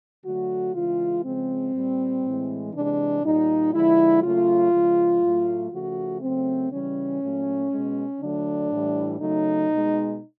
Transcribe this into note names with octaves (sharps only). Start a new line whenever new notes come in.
D3 F#3 A3 F#4
C#3 E3 G#3 F4
C#3 F3 G#3 C4
A#2 G3
A2 E3 G#3
C3 E3 G#3 D4
A#2 G3 D#4
D3 F3 G#3 E4
C#3 F#3 A3 F4
C#3 F3 G#3
A2 F#3 A3
C#3 F3 A3 F#4
C#3 F#3 A3 C4
C#3 E3 G3 C#4
A#2 F#3 A3
G#3
B2
D3 F#3 A3 D4
A2 E3 G3
C#3 F#3 A3 D#4
B2 G#3